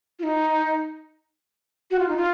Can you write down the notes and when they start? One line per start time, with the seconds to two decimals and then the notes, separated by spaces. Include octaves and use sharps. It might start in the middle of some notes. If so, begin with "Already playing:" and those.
0.19 F4
0.23 D#4
1.91 F#4
1.99 F4
2.08 D#4
2.17 F4